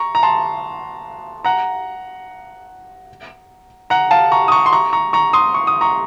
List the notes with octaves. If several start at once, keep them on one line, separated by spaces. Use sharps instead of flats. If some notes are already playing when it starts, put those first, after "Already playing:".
Already playing: A#5 C#6
A#5
A5 C6
F#5 A#5
F#5 A#5
F5 A5
A#5 C#6
D#6
A#5 C#6
C6
A#5 C#6
A#5 C#6
A#5 C#6
C6 D#6
C#6
D#6
A#5 C#6